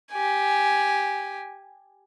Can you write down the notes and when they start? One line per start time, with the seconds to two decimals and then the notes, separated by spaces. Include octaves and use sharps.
0.12 G4 G#5